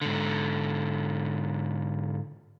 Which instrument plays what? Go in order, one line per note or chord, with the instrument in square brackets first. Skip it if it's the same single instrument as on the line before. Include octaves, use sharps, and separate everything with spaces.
[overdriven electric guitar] G#2 D3